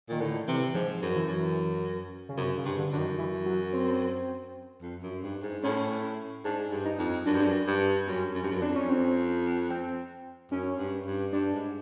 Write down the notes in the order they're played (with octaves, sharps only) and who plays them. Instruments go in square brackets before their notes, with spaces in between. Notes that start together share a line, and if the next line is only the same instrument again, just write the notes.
[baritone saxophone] A#2 [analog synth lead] D#3
[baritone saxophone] A2 [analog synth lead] D3
[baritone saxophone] C3 [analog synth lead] E3
[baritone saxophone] G#2 [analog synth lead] F3
[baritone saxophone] F#2
[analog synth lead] E3
[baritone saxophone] F#2
[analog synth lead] C#3
[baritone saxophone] F#2 [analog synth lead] C3
[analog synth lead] C#3
[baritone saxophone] G2
[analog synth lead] D3
[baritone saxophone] F#2 [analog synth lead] D3
[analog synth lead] D#3
E3
F#3
C4
[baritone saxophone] F2
F#2
G2
G#2
[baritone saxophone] A2 [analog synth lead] C#4
[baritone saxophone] G#2 [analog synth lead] D4
[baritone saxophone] G2
[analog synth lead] D#4
[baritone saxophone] F2
[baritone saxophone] F#2 [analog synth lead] D4
[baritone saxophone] G2
F#2
G2
[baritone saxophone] F#2 [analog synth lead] C#4
[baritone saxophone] F#2
G2
F#2
[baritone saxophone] F2 [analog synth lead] D4
[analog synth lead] C#4
C4
C4
[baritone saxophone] F#2 [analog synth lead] C#4
[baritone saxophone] G2
G2
[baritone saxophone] G2 [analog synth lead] D4
[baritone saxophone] G#2